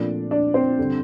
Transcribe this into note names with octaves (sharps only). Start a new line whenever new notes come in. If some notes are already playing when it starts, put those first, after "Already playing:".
Already playing: A#2 F3 A3 C4 D4 D5
D4 D5
C4 C5
G2 D3 G3